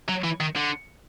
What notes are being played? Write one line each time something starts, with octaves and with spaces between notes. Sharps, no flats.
F#3
E3
D#3
D3